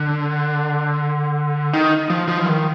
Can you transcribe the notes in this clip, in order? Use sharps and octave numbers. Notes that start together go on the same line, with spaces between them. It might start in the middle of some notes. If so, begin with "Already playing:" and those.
Already playing: D3
D#3
F3
F3
E3
D#3